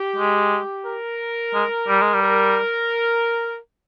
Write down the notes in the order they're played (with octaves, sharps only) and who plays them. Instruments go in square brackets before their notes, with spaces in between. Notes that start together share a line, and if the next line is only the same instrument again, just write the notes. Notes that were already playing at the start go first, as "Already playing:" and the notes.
Already playing: [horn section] G4
[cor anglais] G#3
[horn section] A#4
[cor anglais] G#3
G3
G#3
G3
[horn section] A#4